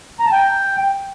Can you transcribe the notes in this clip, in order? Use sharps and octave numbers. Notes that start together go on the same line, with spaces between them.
A#5
A5
G5